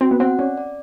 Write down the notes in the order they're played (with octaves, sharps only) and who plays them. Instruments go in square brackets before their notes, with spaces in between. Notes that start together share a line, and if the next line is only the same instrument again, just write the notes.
[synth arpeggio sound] C4 [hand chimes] F#4
[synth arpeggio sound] B3
[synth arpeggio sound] C4 [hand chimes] F#5
[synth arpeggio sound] C#4 [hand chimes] D5
[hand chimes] D5